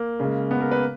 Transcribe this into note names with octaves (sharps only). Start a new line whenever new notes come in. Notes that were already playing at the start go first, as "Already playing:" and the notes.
Already playing: A#3
C#3 G#3
B3
A#4
B4